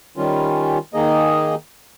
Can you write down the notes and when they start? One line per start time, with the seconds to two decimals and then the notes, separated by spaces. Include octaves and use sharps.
0.17 D#3 G3 C#4 F4
0.94 D#3 A#3 D#4 G#4 D#5